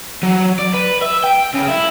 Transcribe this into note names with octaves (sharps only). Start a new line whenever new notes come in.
F#3
D5
B4
E5
G5
C#3
E4